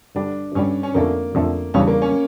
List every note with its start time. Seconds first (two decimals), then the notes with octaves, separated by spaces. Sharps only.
0.15 G2 D3 G3 D4
0.55 G2 D3 G3 C#4
0.83 C#4
0.94 F2 D3 A3 A#3
1.35 F2 D3 A3
1.74 E2 C#3 G3 C#4 D4
1.87 A#3
2.02 C#4